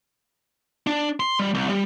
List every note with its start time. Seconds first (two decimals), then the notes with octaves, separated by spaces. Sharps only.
0.87 D4
1.20 C6
1.39 G3
1.54 C2
1.69 G3